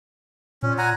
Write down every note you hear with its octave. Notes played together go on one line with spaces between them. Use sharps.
A#2 C#4
F#5 G#5 A#5